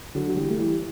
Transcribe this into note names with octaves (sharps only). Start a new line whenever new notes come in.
D3 F#3
F#3
E3 G3
A3
E3 G3